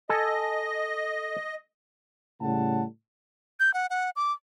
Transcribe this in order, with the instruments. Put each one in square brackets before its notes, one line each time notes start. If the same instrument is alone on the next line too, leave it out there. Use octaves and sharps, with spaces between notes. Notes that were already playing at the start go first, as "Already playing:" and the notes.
[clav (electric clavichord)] A4 G#5 [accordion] D#5
[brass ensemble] A2 C#3 G3 A4 F#5 A5
[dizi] G6
F#5
F#5
D6